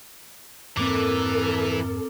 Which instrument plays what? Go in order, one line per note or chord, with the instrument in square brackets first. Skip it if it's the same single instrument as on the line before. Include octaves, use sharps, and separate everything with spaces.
[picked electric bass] F2 G#2 A#3 [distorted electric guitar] E3 [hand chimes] C4 D6 [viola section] A4 A#4